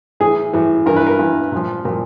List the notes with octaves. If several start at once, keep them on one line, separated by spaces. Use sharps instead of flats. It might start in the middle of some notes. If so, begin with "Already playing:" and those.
A2 E3 G#4
A2 E3
G2 E3 A#4
B4
A#4
G2 E3
A#2 F3
A#2 F3